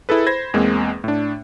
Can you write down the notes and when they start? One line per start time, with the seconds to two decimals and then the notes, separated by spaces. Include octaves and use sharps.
0.09 E4 G#4 A4 B4
0.27 C5 B5 G#6 A#6
0.54 E2 G#3 A#3 C4
1.04 A2 D4